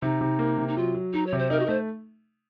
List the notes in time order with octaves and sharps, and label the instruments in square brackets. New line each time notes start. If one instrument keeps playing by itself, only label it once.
[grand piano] C3 [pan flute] D#4
[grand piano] C3
A#3
C3
[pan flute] D#4
[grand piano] F#3 [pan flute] F4
[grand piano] F#3
[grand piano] F#3 [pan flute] D#4
[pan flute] C#5
[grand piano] C3
[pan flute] C5
[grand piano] D#4 [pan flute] A#4
[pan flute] F#4
A#4
[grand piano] A3 [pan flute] C5